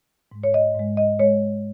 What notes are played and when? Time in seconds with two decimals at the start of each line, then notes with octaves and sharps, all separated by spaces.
0.32 G#2 G#3
0.43 C#5
0.54 D#5
0.75 G#2 G#3
0.97 D#5
1.19 G#3 C#5